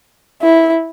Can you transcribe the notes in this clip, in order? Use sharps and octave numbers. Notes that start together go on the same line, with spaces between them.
E4